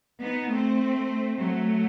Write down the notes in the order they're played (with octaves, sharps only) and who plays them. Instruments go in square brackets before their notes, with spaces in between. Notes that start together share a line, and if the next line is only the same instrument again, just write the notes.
[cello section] B3 D#4
A3 C4
F#3 A3